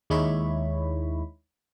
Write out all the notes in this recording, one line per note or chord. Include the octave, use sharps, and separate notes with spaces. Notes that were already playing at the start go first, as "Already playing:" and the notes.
D#2 G#3 D#4 E4 C#5 B5